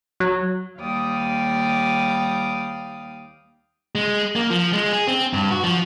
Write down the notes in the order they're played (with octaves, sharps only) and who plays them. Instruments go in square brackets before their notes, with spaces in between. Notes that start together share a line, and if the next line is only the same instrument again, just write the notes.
[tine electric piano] F#3
[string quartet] D#2 G3 D5 F5 G5 D#6
[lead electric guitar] G#3
A#3
F3
G#3
G#4
C4
G2
F#4
F3